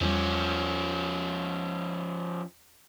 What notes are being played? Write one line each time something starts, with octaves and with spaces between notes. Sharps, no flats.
E2 F3 G3 C#4